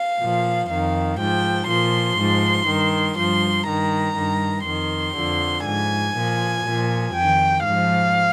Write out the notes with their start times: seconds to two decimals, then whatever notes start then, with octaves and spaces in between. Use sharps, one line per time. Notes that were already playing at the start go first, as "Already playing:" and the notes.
Already playing: F5
0.20 A#2 F3
0.69 F2 D#3 F5
1.19 G#2 F3 G5
1.69 A#2 F3 C6
2.19 G#2 F3
2.69 G2 D#3
3.17 G2 F3 C6
3.67 G2 D#3 A#5
4.17 G2 D#3
4.67 F2 D#3 C6
5.17 F2 D3 F3
5.66 G#2 F3 G#5
6.16 A#2 F3
6.66 A#2 F3
7.15 F2 D#3 G5
7.65 G#2 F3 F5